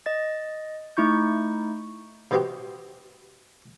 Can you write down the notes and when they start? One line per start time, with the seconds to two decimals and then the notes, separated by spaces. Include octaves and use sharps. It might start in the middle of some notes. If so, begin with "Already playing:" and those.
0.06 D#5 A6
0.97 A3 D#4 E4 C#6 G6
2.31 C3 D#3 B3 C4 F#4 G4